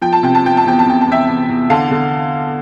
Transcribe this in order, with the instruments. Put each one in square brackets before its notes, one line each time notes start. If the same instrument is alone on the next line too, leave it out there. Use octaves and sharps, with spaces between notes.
[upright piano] F3 G5
A5
C3 G5
A5
F3 G5
A5
E2 G5
A5
E2 G5
A5
E2 E5 G5
E2
E2
D3 F5 A5
D3